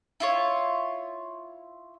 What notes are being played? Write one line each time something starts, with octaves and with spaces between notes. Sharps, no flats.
E4 F4 C#5